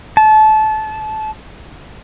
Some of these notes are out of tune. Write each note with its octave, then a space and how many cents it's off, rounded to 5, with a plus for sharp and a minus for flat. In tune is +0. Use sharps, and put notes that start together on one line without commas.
A5 -25